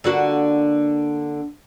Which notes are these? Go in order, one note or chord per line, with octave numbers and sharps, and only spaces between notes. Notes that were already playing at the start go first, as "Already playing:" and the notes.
D3 A#3 F#4